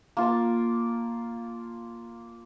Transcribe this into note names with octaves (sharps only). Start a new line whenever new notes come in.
A#3 F4 A5